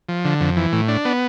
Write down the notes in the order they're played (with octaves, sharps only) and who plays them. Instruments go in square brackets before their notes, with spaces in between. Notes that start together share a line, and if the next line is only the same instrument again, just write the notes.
[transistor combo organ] F3
D3
F2
E3
A2
D4
B3